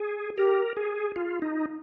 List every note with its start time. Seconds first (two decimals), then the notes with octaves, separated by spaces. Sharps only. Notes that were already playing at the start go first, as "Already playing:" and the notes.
Already playing: G#4
0.37 G4 A#4
0.77 G#4
1.16 F4
1.42 D#4